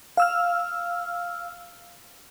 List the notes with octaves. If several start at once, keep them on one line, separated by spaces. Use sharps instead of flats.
F5 E6 F6